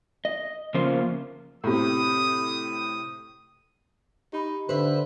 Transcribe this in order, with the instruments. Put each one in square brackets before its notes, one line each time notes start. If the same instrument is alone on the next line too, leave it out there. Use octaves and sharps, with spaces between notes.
[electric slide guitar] D#5
C#3 F3 A#3 C#4 F4 C5
[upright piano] A2 C3 [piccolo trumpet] D#6
[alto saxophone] D#4 [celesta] G4 B5
[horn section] D3 [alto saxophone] B4 [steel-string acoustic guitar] C5 E5